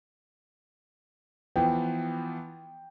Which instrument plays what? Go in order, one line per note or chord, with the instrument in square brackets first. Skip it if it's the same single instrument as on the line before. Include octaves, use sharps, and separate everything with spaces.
[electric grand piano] E3 F3 B3 [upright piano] G5